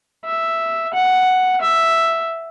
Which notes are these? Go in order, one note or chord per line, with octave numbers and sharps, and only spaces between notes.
E5
F#5
E5